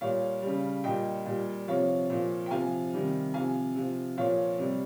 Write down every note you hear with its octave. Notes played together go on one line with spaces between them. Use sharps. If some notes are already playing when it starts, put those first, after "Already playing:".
A#2 G3 C#5 F5
G3
C#3
A#2 G3 D#5 G5
A#2 G3
C3 F3 C#5 F5
A#2 F3
G5
C3 F3 F5 G#5
C3 D#3 G3
C3 F3 F5 G#5
C3 F3
A#2 F3 C#5 F5
C3 G3